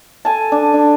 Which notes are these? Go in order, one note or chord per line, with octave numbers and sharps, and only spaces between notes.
A4 G#5 A5
D4
D4